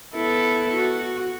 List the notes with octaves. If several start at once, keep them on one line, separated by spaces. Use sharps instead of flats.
B3 E4 A4
F#4